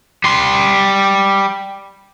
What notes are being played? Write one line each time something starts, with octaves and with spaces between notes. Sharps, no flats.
G3 C6